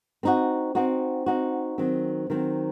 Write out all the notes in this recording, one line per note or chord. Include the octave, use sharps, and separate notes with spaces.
C4 D#4 F#4
C4 D#4 F#4
C4 D#4 F#4
D#3 F#3 C4
D#3 F#3 C4